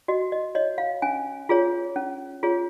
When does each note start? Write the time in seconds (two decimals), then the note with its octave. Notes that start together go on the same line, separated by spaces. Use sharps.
0.08 F#4 D#5
0.32 D#5
0.55 C#5 D#5
0.78 F5
1.02 C#4 G#5
1.49 F4 G#4 C#5
1.96 C#4
2.43 F4 G#4 C#5